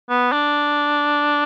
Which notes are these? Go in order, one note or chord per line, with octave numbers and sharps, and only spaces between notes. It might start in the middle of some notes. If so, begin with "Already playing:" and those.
B3
D4